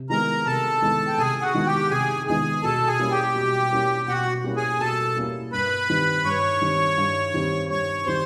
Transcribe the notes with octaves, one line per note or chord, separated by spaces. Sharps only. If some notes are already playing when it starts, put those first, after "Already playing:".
Already playing: C3
D#3 G#3 B3 E4 A#4 A#5
C3 A4 A5
D#3 G#3 B3 E4
G5
C3 G#4 G#5
F#4 F#5
D#3 G#3 B3 E4
G4 G5
C3 G#4 G#5
D#3 G#3 B3 E4 G#4 G#5
B2 A4 A5
G#4 G#5
G3 A#3 C#4 E4
G4 G5
B2
G3 A#3 C#4 E4
B2 F#4 F#5
G3 A#3 C#4 E4
G#4 G#5
B2 A4 A5
G3 A#3 C#4 E4
G2 B4 B5
D#3 G3 C4
G2 C#5 C#6
D#3 G3 C4
G2
D#3 G3 C4
G2 C#5 C#6
D#3 G3 C4 C5 C6